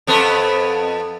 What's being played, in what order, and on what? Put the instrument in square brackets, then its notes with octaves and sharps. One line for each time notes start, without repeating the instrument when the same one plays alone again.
[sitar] F2 B3 A4